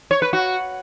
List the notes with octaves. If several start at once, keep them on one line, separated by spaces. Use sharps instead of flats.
C#5
B4
F#4